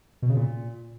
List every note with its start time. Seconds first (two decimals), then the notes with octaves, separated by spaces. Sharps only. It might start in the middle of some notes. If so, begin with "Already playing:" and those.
0.22 B2
0.29 C#3
0.37 A#2